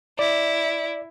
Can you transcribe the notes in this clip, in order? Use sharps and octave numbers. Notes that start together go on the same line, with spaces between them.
E4 D5